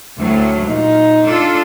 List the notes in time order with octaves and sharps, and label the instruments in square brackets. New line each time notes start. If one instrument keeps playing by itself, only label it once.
[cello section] D2 F#3 [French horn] A2
[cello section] A#2 [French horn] D#4
[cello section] D4 F4 A4